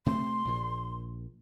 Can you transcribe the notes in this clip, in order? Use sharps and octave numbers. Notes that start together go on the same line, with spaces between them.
C3 A3 C4 C6
A#1 A#2